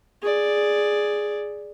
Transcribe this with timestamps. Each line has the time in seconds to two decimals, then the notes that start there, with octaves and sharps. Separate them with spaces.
0.22 G#4 D5